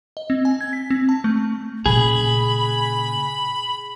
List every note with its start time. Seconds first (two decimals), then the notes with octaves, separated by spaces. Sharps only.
0.17 D#5
0.30 C4
0.45 G#5
0.61 G#6
0.73 B6
0.90 C4
1.09 A5
1.24 A3
1.86 A#2 C#3 G#4 B5